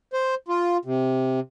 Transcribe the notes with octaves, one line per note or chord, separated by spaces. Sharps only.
C5
F4
C3